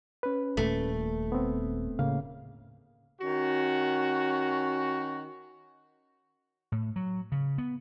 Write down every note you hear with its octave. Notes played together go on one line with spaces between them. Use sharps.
C#4 B4
D#1 A#2 A3
B3 C4
A2 C#3 A#3 F5
D#3 C#4 F#4
A2
F#3
C#3
B3